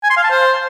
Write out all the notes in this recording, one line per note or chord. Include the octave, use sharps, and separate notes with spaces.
G#5
C6
F5
A5
C5